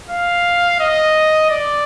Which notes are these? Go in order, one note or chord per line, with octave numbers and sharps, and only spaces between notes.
F5
D#5
D5